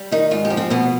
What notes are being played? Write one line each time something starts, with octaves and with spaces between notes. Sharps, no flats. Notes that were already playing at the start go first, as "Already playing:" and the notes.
Already playing: G3
D#3 D#4
G#2 F4
G4
F3
C4
B2 B3